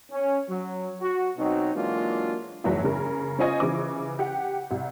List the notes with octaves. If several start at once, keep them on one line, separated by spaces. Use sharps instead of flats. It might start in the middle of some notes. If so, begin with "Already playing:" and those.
C#4
F#3
F#4
B2 F#3 C4 D#4
E3 F#3 G#3 A#3 D4 F4
F#1 G#2 E3 F#3 G3 E5
C#3 A#4
C#4 F4 C5 D#5 G#5 C#6
C#3 E3 D6
G4 F#5
C2